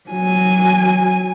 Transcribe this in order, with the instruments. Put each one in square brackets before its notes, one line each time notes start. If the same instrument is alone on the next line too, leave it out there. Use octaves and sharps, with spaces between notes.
[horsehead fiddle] F#3 G#5